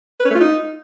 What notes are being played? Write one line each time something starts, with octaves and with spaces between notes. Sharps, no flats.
B4
C#4
A3
F4
D#4